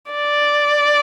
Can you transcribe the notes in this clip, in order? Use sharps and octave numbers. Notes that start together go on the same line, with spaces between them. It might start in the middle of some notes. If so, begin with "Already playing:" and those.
D5